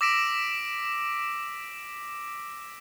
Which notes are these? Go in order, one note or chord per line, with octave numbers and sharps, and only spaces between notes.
D6 E6 A#6 B6 D7 E7